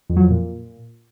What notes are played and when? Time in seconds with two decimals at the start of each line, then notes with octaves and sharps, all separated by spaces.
0.09 F2
0.16 F#3
0.23 F2
0.30 A#2